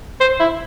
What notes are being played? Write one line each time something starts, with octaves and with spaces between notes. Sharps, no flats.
C5
E4